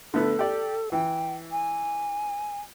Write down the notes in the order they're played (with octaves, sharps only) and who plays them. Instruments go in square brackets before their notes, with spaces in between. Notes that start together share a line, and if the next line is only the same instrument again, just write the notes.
[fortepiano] D3 A3 B3 [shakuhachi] A4
[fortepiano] G4 D5
[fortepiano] E3 [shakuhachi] G5
[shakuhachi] G#5